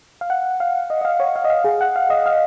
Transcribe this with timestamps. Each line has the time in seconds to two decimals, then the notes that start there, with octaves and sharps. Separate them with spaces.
0.21 F5
0.30 F#5
0.60 F5
0.90 D#5
1.01 D#5
1.05 F5
1.20 C#5
1.36 F5
1.44 D#5
1.50 F5
1.64 G#4
1.81 F#5
1.96 F5
2.10 D#5
2.26 F5